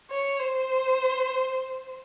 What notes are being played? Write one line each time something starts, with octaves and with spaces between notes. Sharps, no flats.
C#5
C5